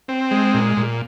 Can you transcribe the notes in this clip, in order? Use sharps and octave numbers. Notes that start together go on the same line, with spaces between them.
C4
G#3
A#2
A#2